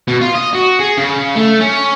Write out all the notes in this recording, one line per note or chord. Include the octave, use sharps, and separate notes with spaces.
B2
F4
D#5
F#4
G#4
C#3
A3
C#4